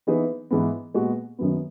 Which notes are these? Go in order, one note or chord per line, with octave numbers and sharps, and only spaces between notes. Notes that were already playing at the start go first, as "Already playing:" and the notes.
E3 B3 D#4 G#4 B4
G#2 E3 B3
A#2 G#3 B3 F#4
F#2 D#3 F#3 B3